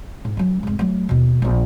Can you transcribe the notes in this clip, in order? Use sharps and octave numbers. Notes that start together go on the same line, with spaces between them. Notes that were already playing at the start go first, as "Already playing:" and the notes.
G#2
F#3 C#4
F1 G#2
F#3 A3
D#2 B2
A#1 B3